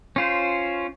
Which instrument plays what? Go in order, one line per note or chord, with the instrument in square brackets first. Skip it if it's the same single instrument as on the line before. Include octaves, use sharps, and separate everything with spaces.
[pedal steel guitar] C#4 F4 C5